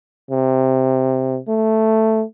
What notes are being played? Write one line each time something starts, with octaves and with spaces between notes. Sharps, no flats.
C3
A3